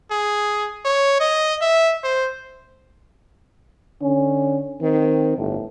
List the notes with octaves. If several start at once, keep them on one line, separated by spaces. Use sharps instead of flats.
G#4
C#5
D#5
E5
C5
D3 C#4
D#3 C4
G1 A2